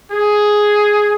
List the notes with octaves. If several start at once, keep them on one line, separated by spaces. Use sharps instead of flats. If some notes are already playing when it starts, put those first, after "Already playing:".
G#4